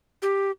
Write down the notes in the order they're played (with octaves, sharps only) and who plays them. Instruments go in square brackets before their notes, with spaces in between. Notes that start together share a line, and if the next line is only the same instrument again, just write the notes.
[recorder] G4